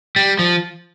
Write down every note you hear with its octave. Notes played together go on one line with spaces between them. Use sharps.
G3
F3